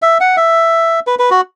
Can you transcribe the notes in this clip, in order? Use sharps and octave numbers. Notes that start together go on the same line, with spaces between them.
E5
F#5
E5
B4
B4
F#4